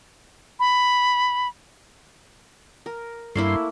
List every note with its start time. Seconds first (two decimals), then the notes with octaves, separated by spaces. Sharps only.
0.60 B5
2.86 A#4
3.36 G2 A3 A#3 E4 C6